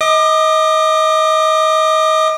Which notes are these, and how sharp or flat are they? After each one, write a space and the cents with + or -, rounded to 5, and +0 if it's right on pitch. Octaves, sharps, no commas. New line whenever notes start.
D#5 +25 D6 +40